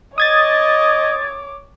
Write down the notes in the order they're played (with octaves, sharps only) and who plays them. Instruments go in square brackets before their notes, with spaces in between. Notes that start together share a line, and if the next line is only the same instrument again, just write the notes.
[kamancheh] C#5 D6 [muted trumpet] D#5 [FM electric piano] D#6 G#6 A6